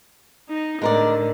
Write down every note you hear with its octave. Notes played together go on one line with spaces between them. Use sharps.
D#4
A2 D3 D#3 G#3 A#4 D5